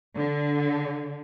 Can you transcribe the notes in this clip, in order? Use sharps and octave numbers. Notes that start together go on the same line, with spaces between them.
D3